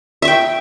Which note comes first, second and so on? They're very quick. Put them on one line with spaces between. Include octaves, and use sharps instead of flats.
E5 C#6 G5